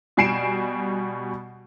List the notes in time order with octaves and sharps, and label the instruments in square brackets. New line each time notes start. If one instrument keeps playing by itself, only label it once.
[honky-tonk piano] B2 G3 G#5 C7 D7 E7